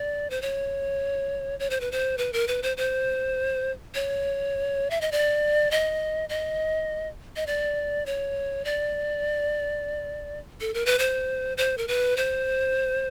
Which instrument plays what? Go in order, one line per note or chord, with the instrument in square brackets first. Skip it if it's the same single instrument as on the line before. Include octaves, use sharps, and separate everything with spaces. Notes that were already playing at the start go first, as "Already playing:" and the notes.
Already playing: [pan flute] D5
C5
C#5
C#5
C5
B4
C5
B4
A#4
B4
C5
C5
C#5
E5
D#5
D5
D#5
D#5
D#5
D5
C#5
D5
A4
A#4
B4
C5
C5
A#4
B4
C5